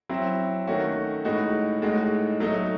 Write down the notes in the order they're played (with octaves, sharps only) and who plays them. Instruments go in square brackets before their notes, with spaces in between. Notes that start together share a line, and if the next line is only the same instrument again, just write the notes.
[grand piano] F#3 C4 E4
D#3 A3 C#4 F#4
A2 G#3 D#4 F#4
A2 G#3 D#4 F#4
F#3 A3 D#4